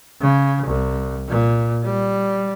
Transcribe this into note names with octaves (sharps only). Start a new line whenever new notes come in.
C#3
C2
A#2
G3